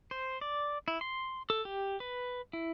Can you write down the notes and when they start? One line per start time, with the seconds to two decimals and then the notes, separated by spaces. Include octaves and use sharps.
0.11 C5
0.41 D5
0.88 E4
1.01 C6
1.50 A4
1.65 G4
2.00 B4
2.53 E4